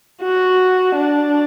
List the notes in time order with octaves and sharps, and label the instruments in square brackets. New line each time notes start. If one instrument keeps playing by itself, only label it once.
[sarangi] F#4
D4